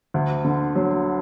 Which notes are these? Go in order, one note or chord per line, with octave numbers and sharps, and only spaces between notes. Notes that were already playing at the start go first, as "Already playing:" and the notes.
D2
D3
F#3